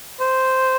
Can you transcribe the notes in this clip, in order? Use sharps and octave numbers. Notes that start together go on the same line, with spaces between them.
C5